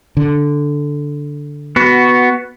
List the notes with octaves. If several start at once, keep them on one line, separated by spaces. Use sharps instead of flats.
D3
B3 F#4